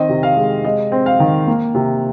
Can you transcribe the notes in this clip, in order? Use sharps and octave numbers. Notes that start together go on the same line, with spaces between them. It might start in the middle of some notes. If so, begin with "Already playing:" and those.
Already playing: D#3 C4 D#5
C3
F5
G#3
G#3 D#5
C4
F5
D#3
A#3
C3